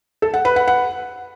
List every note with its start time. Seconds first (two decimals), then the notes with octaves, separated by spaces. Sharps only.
0.22 A4
0.34 F#5
0.45 B4
0.56 F#5
0.67 F#5